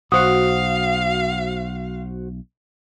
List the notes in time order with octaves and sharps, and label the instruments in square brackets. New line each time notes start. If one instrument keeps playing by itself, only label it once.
[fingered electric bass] B1 [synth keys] F#4 C5 F#5 [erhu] F5 [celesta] D#6